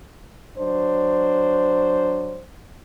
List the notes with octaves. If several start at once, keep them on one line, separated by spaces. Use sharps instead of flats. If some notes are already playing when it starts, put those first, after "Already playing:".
F#3 D4 C5